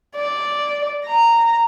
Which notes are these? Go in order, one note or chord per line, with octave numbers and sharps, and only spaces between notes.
D5
A#5